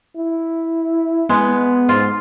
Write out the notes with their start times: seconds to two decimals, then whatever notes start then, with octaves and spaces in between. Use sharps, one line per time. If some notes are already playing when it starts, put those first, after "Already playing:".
0.16 E4
1.29 G#3 B3
1.89 G#2 F4